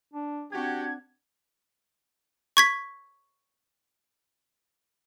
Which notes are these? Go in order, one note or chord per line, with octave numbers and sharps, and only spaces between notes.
D4
C4 D4 F#4 G4 F#5 G#6
C#6 G#6 B6